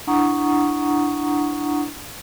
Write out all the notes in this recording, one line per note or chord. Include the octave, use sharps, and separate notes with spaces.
D4 E4 F#5 A#5 C#6 D#6